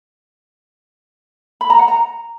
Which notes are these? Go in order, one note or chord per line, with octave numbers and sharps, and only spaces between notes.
B5
A#5
F#5
A#5